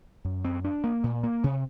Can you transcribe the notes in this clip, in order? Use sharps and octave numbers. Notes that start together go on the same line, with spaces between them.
F#2
C4
D4
A#3
A#2
A#3
C3